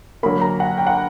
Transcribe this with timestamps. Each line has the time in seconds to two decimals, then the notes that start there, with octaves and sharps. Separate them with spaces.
0.23 D3 F#3 A#3 B5
0.41 A#5
0.60 F#5
0.77 G5
0.87 F#5